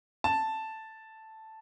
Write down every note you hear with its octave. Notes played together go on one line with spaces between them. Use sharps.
A5